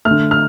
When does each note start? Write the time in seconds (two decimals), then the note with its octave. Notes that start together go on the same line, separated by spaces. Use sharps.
0.05 A3 F6
0.11 D3
0.31 F6